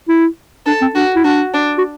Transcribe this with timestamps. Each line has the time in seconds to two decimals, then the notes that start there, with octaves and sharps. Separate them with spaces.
0.08 E4
0.66 D4 A4
0.81 C4
0.95 D4 F#4
1.15 E4
1.24 D4 F#4
1.54 D4
1.78 F#4